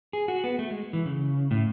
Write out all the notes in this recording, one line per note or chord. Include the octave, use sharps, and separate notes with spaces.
G#4
F#4
B3
A3
G#3
E3
C#3
A2